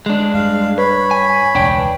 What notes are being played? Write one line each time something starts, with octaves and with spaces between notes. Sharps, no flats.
G#3 D4
G2 F5
B4 C#5 B5
G#5
E1 C#2 D4 G5